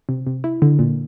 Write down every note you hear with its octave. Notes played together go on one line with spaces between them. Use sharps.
C3
C3
E4
D3
A#2